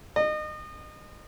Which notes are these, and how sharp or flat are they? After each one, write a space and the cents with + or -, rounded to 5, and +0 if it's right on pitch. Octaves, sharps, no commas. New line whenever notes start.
D#5 -30